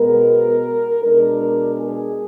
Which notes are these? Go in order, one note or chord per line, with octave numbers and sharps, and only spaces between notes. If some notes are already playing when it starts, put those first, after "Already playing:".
Already playing: B2 G#3 B3 A#4
B2 G#3 D4 A#4
G#4